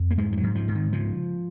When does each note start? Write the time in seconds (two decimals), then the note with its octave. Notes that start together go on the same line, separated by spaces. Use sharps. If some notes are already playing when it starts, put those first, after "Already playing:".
Already playing: F2
0.11 A#3
0.18 G#2 G#3
0.32 F3
0.38 F#3
0.43 G#2
0.55 F3
0.68 G#2
0.75 D#3
0.93 C#3 F3